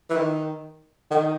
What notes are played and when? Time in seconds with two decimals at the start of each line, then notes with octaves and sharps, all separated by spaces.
0.10 E3
0.16 D#3
1.11 D#3